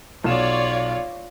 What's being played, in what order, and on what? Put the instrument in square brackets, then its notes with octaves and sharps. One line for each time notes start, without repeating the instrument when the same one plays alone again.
[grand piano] B1 E7 [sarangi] F4 [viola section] C#5 D5